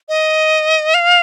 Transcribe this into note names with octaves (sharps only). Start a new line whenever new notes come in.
D#5
F5